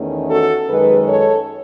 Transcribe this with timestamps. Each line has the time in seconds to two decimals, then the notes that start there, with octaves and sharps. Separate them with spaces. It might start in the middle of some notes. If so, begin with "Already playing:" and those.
Already playing: E2 D#3 A3 C#4
0.30 F#4 A4
0.69 F#2 D#3 G#3 G#4 B4
1.08 A4 C#5